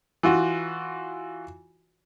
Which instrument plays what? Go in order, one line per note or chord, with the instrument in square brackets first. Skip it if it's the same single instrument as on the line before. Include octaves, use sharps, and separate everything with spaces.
[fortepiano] E3 F4 F#4